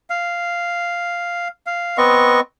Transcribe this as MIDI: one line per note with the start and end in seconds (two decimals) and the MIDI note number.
0.10 1.48 77
1.67 1.97 77
1.98 2.40 59
1.98 2.40 60
1.98 2.40 75
1.98 2.40 85